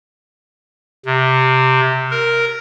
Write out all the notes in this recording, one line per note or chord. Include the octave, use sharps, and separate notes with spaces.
C3
A#4